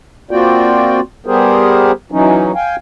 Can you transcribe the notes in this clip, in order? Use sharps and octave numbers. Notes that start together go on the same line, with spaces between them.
A#3 C4 F4 F#4 D5 G5
G3 B3 G4 G#4 A#4 C5
E3 F#3 C#4 D#4
F5 G5 G#5